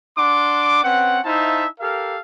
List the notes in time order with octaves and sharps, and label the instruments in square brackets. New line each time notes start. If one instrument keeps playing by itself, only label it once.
[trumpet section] D4 F#5 C6 D6
C4 C#4 B4 F#5
D#4 E4 C5 E5 F5 A5
G4 A4 A#4 F5